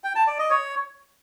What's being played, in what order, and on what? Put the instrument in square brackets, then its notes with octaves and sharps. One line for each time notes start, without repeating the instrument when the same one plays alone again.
[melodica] G5
A5
D5
D#5
C#5